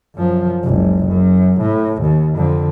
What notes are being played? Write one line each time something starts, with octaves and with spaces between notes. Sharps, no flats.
F#2 F3
F#1 C#2
F#2
A2
D#2
F2 D3